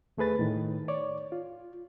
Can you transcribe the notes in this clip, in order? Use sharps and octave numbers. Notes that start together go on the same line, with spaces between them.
D#2 A3 G#4 B4 A6
A2 D#3
C#5 D5
F4